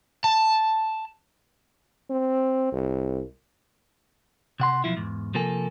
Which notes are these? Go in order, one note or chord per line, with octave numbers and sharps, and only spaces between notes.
A5
C4
C2
C3 F#5 C6
B1 F3 E4
E2 G#2
C3 F3 A#3 A4 G#5